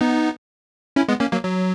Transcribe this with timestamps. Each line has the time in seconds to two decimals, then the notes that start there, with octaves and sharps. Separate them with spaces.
0.01 B3 D#4
0.96 C#4 E4
1.08 G#3 B3
1.20 A#3 C#4
1.32 F#3 A#3
1.44 F#3